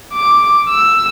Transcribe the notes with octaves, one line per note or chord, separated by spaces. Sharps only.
D6
E6